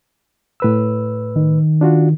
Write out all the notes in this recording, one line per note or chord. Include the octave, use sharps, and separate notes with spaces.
A2 B4 E6
D#3
D4 F4 F#4